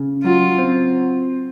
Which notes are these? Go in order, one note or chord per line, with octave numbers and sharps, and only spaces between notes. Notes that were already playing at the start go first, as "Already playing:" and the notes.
Already playing: C#3
F#3 F4
C4